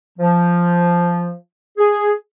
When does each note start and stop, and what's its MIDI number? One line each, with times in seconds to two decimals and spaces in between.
0.18 1.32 53
1.78 2.10 68